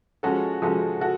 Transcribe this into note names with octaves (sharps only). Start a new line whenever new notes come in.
F3 G#3 C#4 F#4 A4
F3 G#3 C#4 F#4 A4
F#4 A4